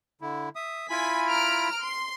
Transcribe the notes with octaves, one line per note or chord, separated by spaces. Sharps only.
D3 E4
E5 D#6
E4 F4 G#5 B5 B6
A#5 F6 D7
C6